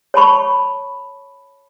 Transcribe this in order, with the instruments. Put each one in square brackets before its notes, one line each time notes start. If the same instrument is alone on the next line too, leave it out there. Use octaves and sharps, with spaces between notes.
[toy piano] C#5 A5 B5 C#6